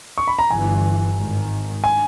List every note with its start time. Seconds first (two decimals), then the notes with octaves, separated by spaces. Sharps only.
0.18 C#6
0.28 B5
0.39 A#5
0.50 G1 G2 E3 G#5
1.17 G#1 G#2 D#3
1.84 G#5